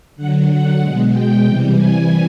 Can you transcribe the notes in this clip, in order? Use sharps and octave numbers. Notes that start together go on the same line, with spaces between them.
D3 F#3 F#5
F#5
B2 G#3
G5
C3 E3 G3 G5
G#5